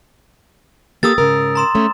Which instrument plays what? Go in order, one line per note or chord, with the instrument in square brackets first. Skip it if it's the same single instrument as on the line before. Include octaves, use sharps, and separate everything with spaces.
[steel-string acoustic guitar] A#3 G4 A4 [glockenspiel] D#6 E6 A6
[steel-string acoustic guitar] G#2 C#3 A#4
[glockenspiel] A#5 C6 E7
[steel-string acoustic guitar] A3 C#4